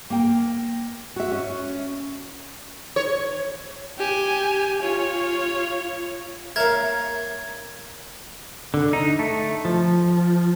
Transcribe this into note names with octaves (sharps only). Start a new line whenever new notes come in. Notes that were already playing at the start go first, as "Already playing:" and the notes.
A#3 G5
F#4 E5
C#4
C#5
G4 G#5
F4 C#5
A#3 A#4 C#5 E5 F5 G#6
D3
D#4
A3
F3